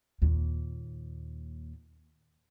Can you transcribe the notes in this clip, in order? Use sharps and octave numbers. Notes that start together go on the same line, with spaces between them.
D#2 A#2